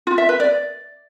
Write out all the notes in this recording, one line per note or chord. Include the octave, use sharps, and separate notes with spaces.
F4
E5
B4
D5